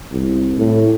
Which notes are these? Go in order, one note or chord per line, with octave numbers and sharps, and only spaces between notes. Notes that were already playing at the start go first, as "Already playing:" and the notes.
C2
A2